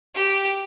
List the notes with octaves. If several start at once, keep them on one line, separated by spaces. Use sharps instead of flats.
G4